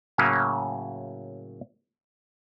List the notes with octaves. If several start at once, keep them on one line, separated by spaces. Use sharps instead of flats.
A2 C#3 F#3 A#3 C#4